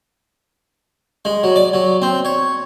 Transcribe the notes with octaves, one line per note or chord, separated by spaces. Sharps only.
G#3
F#3
D5
F#3
C4
C#5